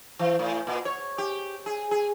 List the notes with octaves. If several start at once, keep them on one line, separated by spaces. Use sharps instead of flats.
E3
A2
A#2
C#5
G4
G#4
G#4